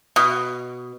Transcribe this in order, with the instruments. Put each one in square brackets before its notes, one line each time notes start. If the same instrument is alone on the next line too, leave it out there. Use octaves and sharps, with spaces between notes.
[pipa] B2